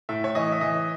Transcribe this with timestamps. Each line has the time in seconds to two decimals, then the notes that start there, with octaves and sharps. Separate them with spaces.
0.09 A2 E5
0.24 C#5
0.35 E3 D#5
0.52 E5
0.61 E3 D#5